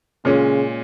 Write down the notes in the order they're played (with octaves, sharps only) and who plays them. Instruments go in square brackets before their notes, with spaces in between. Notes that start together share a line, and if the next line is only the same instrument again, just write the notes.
[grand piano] A#2 G#3 C#4 [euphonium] C#3